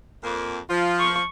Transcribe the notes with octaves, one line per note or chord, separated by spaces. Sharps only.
F2 A#3
F3 F4
C#6